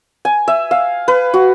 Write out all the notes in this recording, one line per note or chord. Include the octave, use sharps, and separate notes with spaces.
G#5
E5
F5
B4
F#4